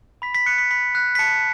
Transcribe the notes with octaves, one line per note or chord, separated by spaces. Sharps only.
B5 B6
B6
F#6 C#7
B6
B5 B6
F#6
B6
A5 C#7